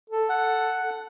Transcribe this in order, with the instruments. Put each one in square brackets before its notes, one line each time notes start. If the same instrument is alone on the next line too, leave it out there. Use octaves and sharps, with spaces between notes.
[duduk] A4
[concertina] F#5